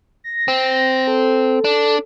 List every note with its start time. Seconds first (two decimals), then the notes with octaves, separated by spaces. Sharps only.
0.24 A#6
0.48 C4
1.07 A4
1.64 D4